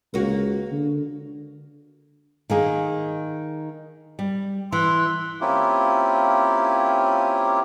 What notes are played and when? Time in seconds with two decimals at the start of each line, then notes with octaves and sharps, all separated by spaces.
0.14 C#2 A#3 F#4
0.72 D3
2.50 D#3 A#3 G#4
4.19 G3
4.72 E3 C6 E6 F#6
5.41 A#3 C4 C#4 E4 F4 G4